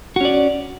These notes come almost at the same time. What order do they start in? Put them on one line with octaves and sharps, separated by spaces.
F#4 C#4 D5